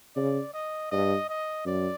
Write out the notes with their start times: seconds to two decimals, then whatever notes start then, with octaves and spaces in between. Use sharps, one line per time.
0.16 C#3 D5
0.54 D#5
0.92 G2 D#5
1.29 D#5
1.66 F#2 D5